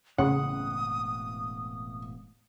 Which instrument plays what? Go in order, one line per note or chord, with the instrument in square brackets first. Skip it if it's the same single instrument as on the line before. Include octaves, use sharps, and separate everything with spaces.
[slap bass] E1 A2 C4 [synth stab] C#3 [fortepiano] F#5 [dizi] D#6